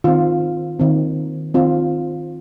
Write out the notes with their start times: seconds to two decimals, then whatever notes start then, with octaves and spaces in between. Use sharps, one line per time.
0.04 D#3 C4 F4
0.80 D#3 C4
1.54 D#3 C4 F4